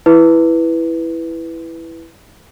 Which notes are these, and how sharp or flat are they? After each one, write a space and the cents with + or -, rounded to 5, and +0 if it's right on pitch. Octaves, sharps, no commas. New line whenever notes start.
E4 +0 B4 +0